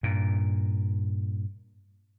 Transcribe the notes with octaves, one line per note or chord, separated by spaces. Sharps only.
G2 A#2